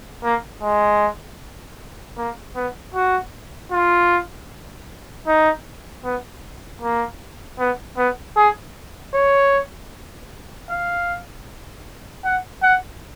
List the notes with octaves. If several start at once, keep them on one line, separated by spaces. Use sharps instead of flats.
A#3
G#3
A#3
B3
F#4
F4
D#4
B3
A#3
B3
B3
G#4
C#5
F5
F#5
F#5